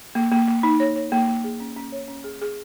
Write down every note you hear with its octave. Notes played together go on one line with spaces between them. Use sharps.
A#3
A#3
A#3
D#4
C#5
C#5
A#3
A#3
G#4
C#4
C#4
C#5
C#4
G#4
G#4